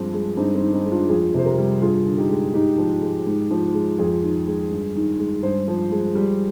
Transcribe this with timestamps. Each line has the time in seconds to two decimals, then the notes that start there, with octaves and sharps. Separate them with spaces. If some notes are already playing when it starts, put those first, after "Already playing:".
Already playing: G2 F3 G#3 C4
0.14 G#3
0.37 G2 C4 D#4
0.55 C4
0.61 D#3
0.73 C4 D#4
0.85 G#3
0.91 D4 F4
1.09 F2 F4 G#4
1.34 C3 C5
1.45 G4 A#4
1.58 G3
1.82 G2 F4 G#4
2.06 D3
2.18 D#4 G4
2.30 G#3
2.54 G#2 D#4 G4
2.78 F3
3.02 G#3
3.27 G#2
3.51 F3
3.74 G#3
3.98 F2 F4 G#4
4.23 D#3
4.47 G#3
4.71 G2
4.95 D#3
5.19 G#3
5.43 G2 G#4 C5
5.68 F3
5.92 G#3
6.15 G3